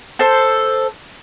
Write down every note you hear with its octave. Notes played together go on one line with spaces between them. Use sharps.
A4 C5